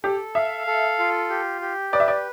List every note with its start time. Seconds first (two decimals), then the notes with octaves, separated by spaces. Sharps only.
0.04 G4 A4
0.35 E5 F5
0.67 A4
0.99 F4
1.30 G4
1.61 G4
1.93 B4 D5
2.00 E5
2.08 D5